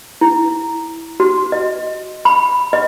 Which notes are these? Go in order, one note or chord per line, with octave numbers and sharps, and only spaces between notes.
E4
F#4
D#5
B5
D#5